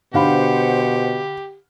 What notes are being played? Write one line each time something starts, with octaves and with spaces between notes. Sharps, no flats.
B2 D3 G4 C5 F5 F#5 B5